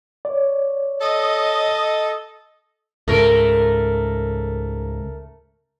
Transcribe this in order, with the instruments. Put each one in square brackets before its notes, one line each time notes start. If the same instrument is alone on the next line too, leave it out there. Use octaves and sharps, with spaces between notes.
[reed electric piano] C#5 D5
[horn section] A4 D#5
[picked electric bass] C#2 G#2 C#3 [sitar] A3 A#4